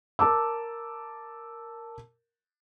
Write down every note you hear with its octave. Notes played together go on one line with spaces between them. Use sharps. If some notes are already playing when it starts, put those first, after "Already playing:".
A#4 A5 D6 E6